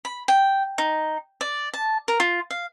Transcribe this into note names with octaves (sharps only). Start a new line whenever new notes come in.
B5
G5
D#4
D5
A5
A#4
F4
F5